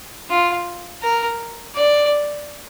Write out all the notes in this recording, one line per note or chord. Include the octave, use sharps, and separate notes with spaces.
F4
A#4
D5